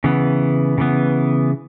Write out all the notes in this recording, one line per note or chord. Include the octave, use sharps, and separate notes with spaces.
C#3 E3 B3
C#3 E3 B3